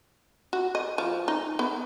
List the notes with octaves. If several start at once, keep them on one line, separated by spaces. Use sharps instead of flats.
F#4
D#5
F3
D#4
B3